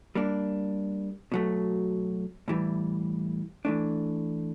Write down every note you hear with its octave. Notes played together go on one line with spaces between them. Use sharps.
G3 A#3 D4
B2 F#3 A3
A2 E3 G3
E3 A3 D4